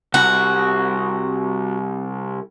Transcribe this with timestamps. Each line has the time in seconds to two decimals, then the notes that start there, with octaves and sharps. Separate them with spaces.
0.14 C2 F#4